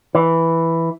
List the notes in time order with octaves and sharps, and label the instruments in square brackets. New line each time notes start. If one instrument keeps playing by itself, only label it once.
[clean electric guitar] E3